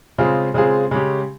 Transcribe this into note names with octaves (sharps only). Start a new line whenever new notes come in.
C#3 G#3 C4 F4 G#4
C#3 G#3 C4 F4 G#4
C#3 G#3 C#4 G4